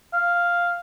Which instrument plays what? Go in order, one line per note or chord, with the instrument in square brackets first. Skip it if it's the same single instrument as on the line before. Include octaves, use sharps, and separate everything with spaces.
[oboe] F5